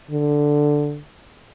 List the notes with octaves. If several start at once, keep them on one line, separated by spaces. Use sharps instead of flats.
D3